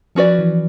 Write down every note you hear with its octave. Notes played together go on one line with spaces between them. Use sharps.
F3 C#4 F#4 B4 D5
E3